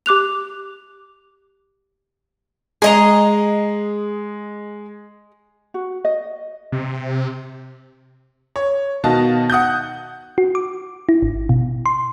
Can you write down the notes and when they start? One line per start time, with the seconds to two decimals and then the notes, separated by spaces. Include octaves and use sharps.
0.06 G4 D6 F#6 F7
2.82 G#3 G#4 D#5 A#5
5.74 F#4
6.05 D#5
6.72 C3
8.56 C#5
9.04 B2 D#3 D#4 F#4 F5 A5
9.50 F#5 D#6 F#6 G6
10.38 F#4
10.55 D6
11.09 E4
11.23 G#1
11.49 B2
11.86 C6